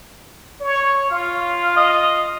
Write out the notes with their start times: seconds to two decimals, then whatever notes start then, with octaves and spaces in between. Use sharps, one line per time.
0.61 C#5
1.11 F4 F5
1.77 D#5